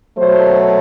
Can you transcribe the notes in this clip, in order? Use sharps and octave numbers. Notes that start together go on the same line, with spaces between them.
B2 F#3 A3 C5